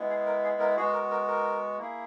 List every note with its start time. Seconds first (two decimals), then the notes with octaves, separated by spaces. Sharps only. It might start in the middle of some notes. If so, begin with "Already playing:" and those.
Already playing: G#3 B3 E4
0.09 G#4
0.26 A#4
0.43 G#4
0.60 A#4
0.77 G#3 B3 F#4 G#4
0.93 A#4
1.11 A#4
1.27 A#4
1.78 A#3 E4 G#4